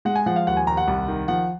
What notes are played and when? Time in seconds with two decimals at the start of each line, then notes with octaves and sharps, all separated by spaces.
0.05 G#3 F#5
0.16 G#5
0.26 F3 F#5
0.36 F5
0.47 D#2 F#5
0.57 G#5
0.67 D#2 A#5
0.77 F#5
0.88 C2
1.08 D#3
1.28 F3 F#5